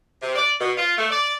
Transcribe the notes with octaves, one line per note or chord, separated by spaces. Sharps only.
C3
D5
B2
F4
A3
D5